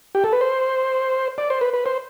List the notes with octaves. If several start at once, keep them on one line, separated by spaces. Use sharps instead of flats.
G4
A4
B4
C5
D5
C5
B4
B4
C5